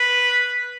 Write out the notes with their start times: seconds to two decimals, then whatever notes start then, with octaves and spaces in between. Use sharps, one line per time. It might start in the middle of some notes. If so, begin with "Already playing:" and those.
Already playing: B4